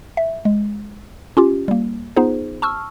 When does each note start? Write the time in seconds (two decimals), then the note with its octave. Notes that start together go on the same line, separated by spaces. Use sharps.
0.17 E5
0.45 G#3
1.37 C#4 F4 G4
1.68 G3 A#3
2.16 B3 D#4 F4 G#4 C5
2.62 A5 C#6 E6 F6